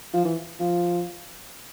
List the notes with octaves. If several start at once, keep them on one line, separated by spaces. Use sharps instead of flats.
F3
E3
F3